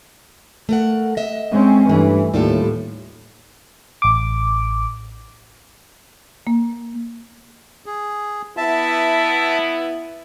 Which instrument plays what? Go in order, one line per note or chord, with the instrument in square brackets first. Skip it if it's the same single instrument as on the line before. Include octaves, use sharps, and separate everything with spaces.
[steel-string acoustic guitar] A3 A#4 F#5
D#5 E5
[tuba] G#3 [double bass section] C4 C#4
[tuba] G2 [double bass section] E3 [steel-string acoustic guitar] A3
[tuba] D#2 [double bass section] A2 [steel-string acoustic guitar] G3 F4 A4
[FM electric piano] A1 D6
[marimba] A#3
[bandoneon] G#4
[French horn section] B3 E4 [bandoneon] E5 A5